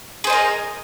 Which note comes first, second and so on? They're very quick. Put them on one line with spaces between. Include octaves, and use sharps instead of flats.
G#4 C5 D#5 A#4